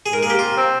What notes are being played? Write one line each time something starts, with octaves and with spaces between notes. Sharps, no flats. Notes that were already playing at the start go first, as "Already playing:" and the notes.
G#2 G#4
A#4
A#3 G#4
G4
C3 F4
C4